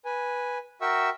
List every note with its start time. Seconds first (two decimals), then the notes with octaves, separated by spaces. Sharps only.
0.05 B4 G#5
0.81 F#4 A#4 E5 G5 C#6 E6